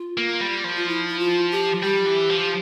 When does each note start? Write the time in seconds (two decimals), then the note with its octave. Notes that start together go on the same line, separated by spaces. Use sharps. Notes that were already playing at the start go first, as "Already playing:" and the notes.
Already playing: F4
0.17 A#3
0.41 G3
0.64 F3
0.76 F4
0.88 E4
1.08 E4
1.19 F4
1.52 G4
1.82 G3 G4
2.06 E3
2.29 F3